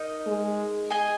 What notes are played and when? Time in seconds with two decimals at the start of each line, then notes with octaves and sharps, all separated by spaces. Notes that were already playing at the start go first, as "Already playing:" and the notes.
Already playing: D#4 A#4 D#5
0.26 G#3
0.90 G#4 D#5 G#5